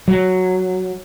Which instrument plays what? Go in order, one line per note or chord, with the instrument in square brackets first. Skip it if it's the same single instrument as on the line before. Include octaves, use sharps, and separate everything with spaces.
[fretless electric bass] F#3